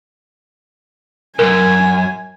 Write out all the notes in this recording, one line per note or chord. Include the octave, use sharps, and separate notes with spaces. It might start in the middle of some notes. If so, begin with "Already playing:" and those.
C2 F#2 A#4 G#5